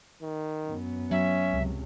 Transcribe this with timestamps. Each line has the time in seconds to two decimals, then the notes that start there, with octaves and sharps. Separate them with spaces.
0.22 D#3
0.67 F#2 B3
1.11 F#3 C#4 E5
1.50 C#2 C3